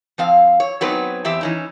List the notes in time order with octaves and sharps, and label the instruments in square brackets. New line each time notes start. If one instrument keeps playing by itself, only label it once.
[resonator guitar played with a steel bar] F3 C4 F5
C#5
F#3 B3 C4 D#4 G#4 B4
E2 C4 G4 E5
E3 C#4 D#4